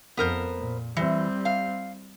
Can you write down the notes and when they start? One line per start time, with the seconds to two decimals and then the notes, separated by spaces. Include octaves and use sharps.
0.17 F2 B3 A#4 C5
0.57 A#2
0.97 E3 G3 C4
1.45 F5